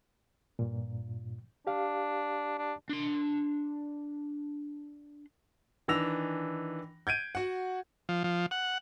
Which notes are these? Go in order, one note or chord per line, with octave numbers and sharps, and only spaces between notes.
G2 A#2
D4 G4 F5
D4
D4 C6
D#3 E3 D4 E6 A#6 F7
G6 G#6 D7 D#7
F#4 F#5
F3
F3
F#5